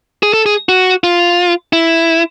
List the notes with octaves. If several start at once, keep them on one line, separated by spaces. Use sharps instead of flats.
G#4
A4
G#4
F#4
F4
E4